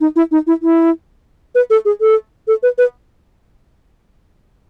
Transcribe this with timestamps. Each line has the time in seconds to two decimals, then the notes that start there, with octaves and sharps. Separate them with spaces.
0.01 D#4
0.16 E4
0.31 D#4
0.47 E4
0.62 E4
1.55 B4
1.70 A4
1.85 G#4
2.01 A4
2.48 A4
2.63 B4
2.78 B4